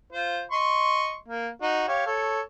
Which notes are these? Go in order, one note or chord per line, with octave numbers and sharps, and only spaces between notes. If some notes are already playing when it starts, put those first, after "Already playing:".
F4 C5
D#5 C6 C#6
A#3
D#4 F#4
G4 C#5 F5
A4 C#5